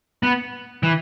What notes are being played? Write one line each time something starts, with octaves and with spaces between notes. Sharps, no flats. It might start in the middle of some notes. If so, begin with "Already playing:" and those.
B3
E3